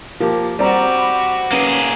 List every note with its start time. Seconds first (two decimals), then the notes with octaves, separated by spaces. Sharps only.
0.20 F3 A#3 G4
0.59 G3 C4 F#4 G4 D5 A#5
0.97 B5
1.52 A#3 C#4 G#4 B4